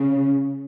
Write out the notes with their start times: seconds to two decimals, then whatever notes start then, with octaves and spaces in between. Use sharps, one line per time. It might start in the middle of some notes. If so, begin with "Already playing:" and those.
Already playing: C#3